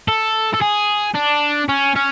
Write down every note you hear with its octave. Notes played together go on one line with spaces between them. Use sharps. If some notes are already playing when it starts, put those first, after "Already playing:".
A4
A4
G#4
D4
C#4
C#4